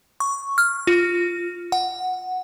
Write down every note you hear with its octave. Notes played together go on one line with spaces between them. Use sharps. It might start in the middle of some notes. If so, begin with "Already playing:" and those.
C#6
F6
F4
F#5